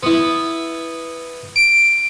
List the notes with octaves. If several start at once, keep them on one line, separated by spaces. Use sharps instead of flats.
B3 E4
D7